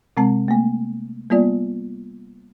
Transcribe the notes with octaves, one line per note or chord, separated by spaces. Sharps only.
C3 G#3 C4 A5
A3 A#3
G3 A#3 B3 F4 D5